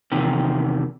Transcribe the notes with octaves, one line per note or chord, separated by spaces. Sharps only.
E2 C3 D#3